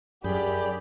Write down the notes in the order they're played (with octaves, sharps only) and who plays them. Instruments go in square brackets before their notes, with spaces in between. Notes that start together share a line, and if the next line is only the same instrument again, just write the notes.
[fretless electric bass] F#2 [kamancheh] G4 D5 [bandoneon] G#4 B5 G6